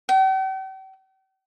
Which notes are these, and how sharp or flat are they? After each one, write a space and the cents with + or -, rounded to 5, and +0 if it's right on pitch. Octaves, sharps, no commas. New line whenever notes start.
G5 -45